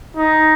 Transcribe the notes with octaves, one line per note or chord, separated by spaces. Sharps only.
D#4